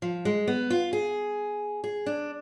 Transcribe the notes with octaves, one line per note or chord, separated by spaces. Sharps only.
F3
G#3
B3
F4
G#4
G#4
D4